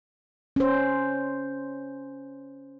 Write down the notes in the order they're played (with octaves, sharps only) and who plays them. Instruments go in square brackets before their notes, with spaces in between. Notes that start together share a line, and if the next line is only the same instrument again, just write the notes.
[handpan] C#4 C5